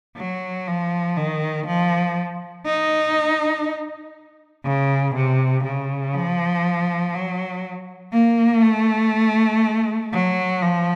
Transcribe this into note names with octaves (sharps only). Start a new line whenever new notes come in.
F#3
F3
D#3
F3
D#4
C#3
C3
C#3
F3
F#3
A#3
A3
F#3
F3